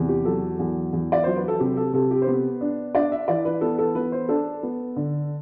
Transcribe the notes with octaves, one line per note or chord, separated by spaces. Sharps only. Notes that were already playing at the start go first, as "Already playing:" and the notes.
Already playing: E2 C3
G4
F#3 A4
E2
E2
D5
F#3 C5
B4
A4
C3 G4
A4
C3 A4
G4
C5
B3 B4
D4
D4 D5
E5
E3 D5
B4
B3 A4
A4
B3 B4
C5
D4 A4
B3
D3